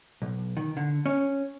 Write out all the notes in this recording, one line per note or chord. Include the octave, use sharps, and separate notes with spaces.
B1
D#3
D3
C#4